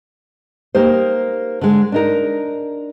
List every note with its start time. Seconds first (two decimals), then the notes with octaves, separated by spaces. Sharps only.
0.75 A#3 D#4 G4 C5
1.61 D3 G#3
1.92 D4 D#4 A#4